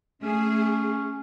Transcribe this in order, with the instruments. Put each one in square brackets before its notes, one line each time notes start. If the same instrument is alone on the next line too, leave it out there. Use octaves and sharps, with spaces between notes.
[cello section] A3 G#4 [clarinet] C#4